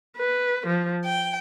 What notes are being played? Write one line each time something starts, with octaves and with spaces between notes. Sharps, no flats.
B4
F3
G5